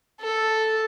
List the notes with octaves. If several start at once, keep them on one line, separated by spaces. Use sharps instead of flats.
A4